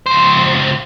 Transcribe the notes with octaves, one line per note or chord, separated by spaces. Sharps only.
C#2 C5